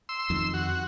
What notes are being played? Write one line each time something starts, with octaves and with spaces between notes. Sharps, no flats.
C6 E6
F2 D#3
F#4